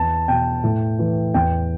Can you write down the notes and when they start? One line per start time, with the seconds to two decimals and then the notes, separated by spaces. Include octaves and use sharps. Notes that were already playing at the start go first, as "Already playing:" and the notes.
Already playing: E2 A5
0.28 B2 G5
0.64 A2
0.99 E3
1.34 E2 G5